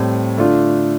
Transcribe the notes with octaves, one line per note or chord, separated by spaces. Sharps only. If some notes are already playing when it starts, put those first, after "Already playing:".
Already playing: A2 G3 C4
D3 A3 D4 F4